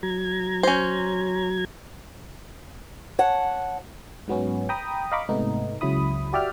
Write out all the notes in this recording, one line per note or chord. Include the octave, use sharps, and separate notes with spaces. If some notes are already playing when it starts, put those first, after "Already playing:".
F#3 A#5 G#6
C#4 C5
C#5 F#5 A5
G#2 F#3 B3 C#4
G5 A#5 B5 D#6
D#5 F5 A#5 B5 C#6 D6
G#2 C3 A3 B3 D#4
C#2 C#3 F#3 E4 B5 D#6
F#4 G4 D5 E5 G5 F6